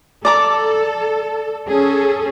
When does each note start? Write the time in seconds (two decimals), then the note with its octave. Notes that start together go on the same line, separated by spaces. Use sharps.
0.25 A4 D5 A#5 D6
1.67 C#4 G#4 A4